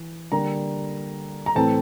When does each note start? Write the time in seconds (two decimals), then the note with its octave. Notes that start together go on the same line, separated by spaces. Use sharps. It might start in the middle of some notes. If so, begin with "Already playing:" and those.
Already playing: E3
0.32 D3 G3 A#3 A#5
1.46 A#5
1.55 A2 E3 A3 C4 A5